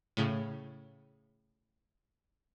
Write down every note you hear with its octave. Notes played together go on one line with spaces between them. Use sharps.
A2 C#3